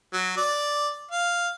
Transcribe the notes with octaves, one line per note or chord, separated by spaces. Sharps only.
F#3
D5
F5